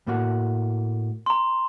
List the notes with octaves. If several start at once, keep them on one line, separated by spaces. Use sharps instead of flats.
A2 A#3 F#4
A#5 C6